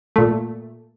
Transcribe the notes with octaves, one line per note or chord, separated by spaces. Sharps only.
A#2 A3